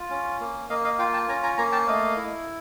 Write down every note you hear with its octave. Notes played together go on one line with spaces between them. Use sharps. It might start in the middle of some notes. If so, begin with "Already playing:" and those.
Already playing: F4
C#4
A#3
A#3 D#5 F5
D#5 F5
F4 F5 G5
G5 A5
C#4 G#5 A#5
G#5 A#5
A#3 G#5 A#5
G5 A5
A3 D#5 F5
E4